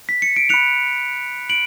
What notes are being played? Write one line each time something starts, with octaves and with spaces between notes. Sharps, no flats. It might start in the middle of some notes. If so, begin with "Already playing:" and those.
B6
C#7
D7
B5 F#6 C#7 F7
D7 F#7